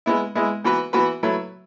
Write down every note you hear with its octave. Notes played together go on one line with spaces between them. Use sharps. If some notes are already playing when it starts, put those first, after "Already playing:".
G#3 B3 E4
G#3 B3 E4
E3 B3 F#4 B4
E3 B3 F#4 B4
F#3 A3 E4 B4